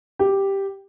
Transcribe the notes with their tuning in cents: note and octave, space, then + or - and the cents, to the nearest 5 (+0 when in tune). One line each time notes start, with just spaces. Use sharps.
G4 +0